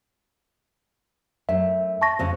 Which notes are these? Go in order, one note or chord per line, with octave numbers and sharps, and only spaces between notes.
F#2 A3 E5
A5 C#6 A#6
F2 C#3 C4